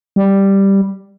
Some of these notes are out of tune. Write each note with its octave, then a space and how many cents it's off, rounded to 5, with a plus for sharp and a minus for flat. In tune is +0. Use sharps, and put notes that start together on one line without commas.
G3 +0